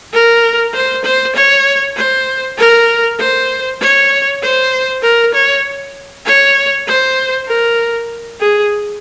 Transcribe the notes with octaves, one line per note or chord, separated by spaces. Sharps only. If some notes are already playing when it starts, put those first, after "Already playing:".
A#4
C5
C5
C#5
C5
A#4
C5
C#5
C5
A#4
C#5
C#5
C5
A#4
G#4